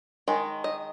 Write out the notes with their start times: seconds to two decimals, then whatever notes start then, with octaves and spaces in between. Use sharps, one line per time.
0.28 D#3 G#3
0.64 D#5